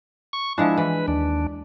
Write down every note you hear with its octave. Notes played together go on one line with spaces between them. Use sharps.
C#6
F3 G#3 D4 E4
E3 B4
D#2 D4